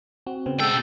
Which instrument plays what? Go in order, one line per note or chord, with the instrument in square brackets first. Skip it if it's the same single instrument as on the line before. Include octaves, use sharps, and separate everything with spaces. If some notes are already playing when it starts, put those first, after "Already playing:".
[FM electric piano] C4 F#4
C#3 B3 C4
[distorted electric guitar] B2 G5 [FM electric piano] G#3 E6 [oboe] A4